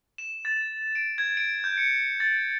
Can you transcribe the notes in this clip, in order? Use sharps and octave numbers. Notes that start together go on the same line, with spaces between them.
E7
A6
D7
G#6
D7
G6
C#7
A6